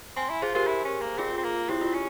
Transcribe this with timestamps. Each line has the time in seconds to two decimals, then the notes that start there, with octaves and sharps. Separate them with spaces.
0.16 C4 G#5 C6
0.29 E4
0.42 F4 G#4 C5
0.55 F4 G4 A#4
0.67 E4
0.85 C#4
1.01 A#3
1.18 C4 F4 G#4
1.38 C4
1.44 A#3
1.69 C4 E4 G4
1.81 F4
1.94 C#4